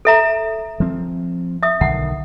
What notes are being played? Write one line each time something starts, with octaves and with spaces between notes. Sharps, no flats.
A4 E5 A#5
F3 C4
E5 D#6
B1 D3 D#3 F#5